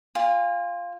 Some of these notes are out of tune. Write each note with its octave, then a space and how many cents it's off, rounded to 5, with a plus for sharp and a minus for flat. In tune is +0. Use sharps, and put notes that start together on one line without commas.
F4 +0 G#5 -40